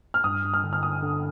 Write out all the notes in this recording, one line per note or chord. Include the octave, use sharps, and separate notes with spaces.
F6
G2 D#6
G2
F6
D3
F6
D3 D#6
D3